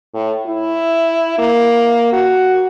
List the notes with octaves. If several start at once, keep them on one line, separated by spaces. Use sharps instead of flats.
A2
E4
A#3
F#4